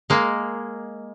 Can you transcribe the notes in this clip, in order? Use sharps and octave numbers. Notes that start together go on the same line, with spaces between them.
G#3 A#3